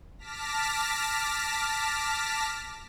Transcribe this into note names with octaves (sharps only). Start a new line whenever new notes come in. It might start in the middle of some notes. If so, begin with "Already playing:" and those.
A5 D6 F6 A#6 B6